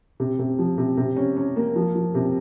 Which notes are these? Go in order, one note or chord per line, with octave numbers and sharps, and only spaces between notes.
C3
C3
F3
C3
C3
C#4
C#4
A#3
F3
F3
C3